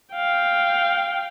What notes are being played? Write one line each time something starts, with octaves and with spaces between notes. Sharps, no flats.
F5 G5